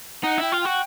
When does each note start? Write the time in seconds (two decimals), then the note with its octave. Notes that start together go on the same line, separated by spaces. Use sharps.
0.23 D#4 F#5
0.38 E4 G5
0.52 F4
0.61 F#4 G5